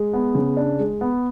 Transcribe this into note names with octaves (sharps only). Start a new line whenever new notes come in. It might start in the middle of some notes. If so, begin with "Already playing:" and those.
Already playing: G#3
B3
C#3
D4
G#3
B3